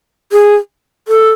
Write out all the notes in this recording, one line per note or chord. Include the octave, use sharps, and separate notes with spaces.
G#4
A4